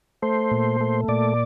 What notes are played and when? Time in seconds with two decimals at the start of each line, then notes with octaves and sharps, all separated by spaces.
0.22 A3 C5
0.51 A#2
0.81 A3
1.08 A#2 D5